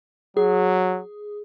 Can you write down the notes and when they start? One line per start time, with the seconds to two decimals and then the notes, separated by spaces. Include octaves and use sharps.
0.37 F#3 G#4